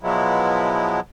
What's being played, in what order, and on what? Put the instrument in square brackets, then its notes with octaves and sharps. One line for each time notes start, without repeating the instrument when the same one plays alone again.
[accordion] B2 F3 F#3 G#3 B3 E4